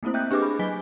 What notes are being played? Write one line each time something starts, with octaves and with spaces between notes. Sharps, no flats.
A3 A#3 C4 E4 C5
D#5 E5 G5 F#6 G6
D4 G4 G#4 B4 D#5 D6
B5
F#3 D#5 G#5 B6 G7